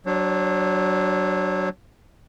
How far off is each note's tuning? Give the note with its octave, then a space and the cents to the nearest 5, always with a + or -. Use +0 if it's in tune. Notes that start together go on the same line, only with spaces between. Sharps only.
F#3 +20 D4 +0 C#5 -40